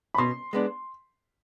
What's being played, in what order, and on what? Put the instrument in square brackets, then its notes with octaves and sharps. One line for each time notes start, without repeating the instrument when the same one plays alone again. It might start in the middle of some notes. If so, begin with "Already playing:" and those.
[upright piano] B5
[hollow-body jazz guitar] B2 [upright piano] C6
[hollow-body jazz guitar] G#3 B3 D4